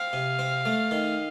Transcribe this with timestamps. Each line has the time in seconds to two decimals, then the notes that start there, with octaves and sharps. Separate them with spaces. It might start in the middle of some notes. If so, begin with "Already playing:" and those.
Already playing: C4 F5
0.13 C3
0.39 C4
0.66 A3
0.91 D#3